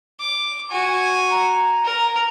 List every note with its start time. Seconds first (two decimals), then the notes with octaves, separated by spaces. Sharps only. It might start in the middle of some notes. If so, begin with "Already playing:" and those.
0.20 D6
0.71 F#4 G#5
1.31 A#5
1.85 A#4